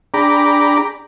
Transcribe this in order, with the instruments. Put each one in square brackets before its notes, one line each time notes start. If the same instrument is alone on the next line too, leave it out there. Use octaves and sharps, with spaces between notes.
[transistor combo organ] D4 G#4 G5 A#5 B5 D6